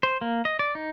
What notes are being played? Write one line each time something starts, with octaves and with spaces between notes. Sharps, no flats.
C5
A#3
D#5
D5
D#4